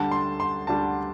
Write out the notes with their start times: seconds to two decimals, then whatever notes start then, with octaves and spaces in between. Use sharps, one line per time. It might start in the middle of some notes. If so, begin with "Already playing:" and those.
Already playing: D2 D3 G3 D4 A5
0.11 C6
0.40 C6
0.67 D2 D3 G3 D4 A5